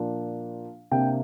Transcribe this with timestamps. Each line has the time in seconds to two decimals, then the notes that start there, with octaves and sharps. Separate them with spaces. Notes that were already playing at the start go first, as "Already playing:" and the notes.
Already playing: A#2 F3 A#3 D4
0.91 C3 A#3 D4 G5